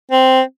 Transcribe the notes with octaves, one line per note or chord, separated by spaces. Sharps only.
C4